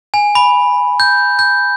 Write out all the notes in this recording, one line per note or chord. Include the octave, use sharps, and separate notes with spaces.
G#5
B5
G6
G6